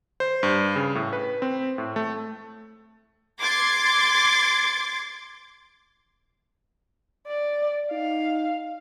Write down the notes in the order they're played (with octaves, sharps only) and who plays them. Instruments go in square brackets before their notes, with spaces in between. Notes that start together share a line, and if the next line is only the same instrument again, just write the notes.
[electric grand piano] C5
G2
C#3
A2
B4
C4
A2
A3
[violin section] C6 D6 G#6 A6 C7
[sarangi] D5
[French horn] D#4 [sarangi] F5